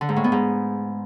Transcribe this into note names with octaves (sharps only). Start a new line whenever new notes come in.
D3
G#2
A2
B3
G#2